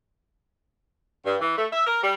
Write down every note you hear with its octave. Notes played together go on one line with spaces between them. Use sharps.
G2
E3
A3
E5
A#4
G3